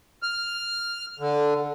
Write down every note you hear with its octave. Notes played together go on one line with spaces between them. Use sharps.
F6
D3